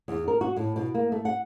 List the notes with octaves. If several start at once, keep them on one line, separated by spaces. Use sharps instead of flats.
E2
A#4
F#4
A2
B2
A#3
A3
F#5